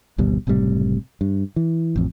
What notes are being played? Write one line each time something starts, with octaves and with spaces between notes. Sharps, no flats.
G#1 D2 B2 G3
F#1 A2 C3 G3
G2
E3
A1 F2